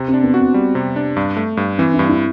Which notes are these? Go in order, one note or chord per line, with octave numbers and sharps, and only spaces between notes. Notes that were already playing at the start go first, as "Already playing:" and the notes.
Already playing: C3
C4
D4
B3
F#4
C4
G3
C3
D4
G2
A3
G2
E3 C4
E4
G2
E4